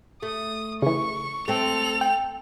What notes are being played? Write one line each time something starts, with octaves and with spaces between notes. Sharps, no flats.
A3 D#6
C#3 E3 C#6
A3 C4 A4 F7
G5